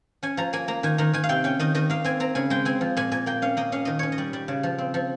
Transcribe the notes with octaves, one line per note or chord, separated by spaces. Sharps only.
C#4 G#5
F3 A#5
A#3 G#5
A#3 A#5
D#3 G#5
D#3 A#5
D#3 G#5
F5
C3 G5
C#4 G5
D#3 D#5
D#3 D#5
A#3 F5
C4 G#5
C4 A#5
C#3 G#5
G#3 G5
C4 G#5
F3
A#2 G#5
A#2 G#5
A#3 G5
C#4 F5
A#3 D#5
C#4 F5
D#3 D#5
C#4 C#5
D#5
G3
G3
C#3
F3
C4
F3